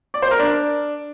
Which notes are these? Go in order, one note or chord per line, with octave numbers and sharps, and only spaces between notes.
D5
C5
A#4
D4